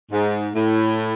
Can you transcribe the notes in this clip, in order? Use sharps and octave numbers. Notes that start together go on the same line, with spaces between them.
G#2
A2